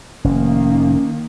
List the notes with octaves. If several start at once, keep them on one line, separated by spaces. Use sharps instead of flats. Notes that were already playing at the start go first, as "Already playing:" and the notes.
F1 D#3 A#3 C#4